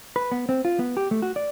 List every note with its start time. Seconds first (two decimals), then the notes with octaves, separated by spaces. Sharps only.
0.16 B4
0.32 B3
0.49 C4
0.65 F4
0.79 B3
0.97 G4
1.11 A3
1.22 F#4
1.36 D5